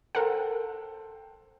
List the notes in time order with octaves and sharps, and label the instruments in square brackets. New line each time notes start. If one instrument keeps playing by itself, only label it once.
[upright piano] A4 C5 G5 [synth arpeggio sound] A#4 F#5